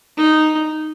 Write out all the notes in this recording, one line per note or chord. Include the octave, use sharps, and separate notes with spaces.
D#4